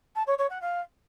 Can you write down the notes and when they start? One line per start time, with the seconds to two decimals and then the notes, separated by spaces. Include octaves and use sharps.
0.15 A5
0.27 C#5
0.38 C#5
0.49 F#5
0.61 F5